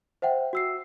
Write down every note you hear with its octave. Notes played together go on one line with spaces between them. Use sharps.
C5 E5 F#5 G5
F#4 E6 C7